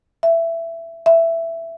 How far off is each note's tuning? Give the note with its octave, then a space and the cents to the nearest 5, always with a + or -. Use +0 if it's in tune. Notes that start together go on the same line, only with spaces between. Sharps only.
E5 +15
E5 +10